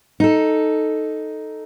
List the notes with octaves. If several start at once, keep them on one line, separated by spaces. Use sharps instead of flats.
D#4 A4